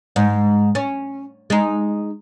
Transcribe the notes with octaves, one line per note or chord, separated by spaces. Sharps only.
G#2
C#4
G#3 D#4